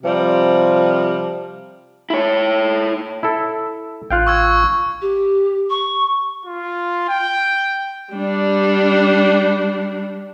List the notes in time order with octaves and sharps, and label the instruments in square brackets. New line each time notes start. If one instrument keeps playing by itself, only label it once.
[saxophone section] C3 F3 G3
[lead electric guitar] E4 C#5
[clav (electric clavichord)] E4 A4
[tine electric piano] A1 F#6 [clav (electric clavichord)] F4 F5 G5
[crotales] C#6 E6 G#6
[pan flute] G4
C#6
[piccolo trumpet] F4
G5
[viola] G3 D4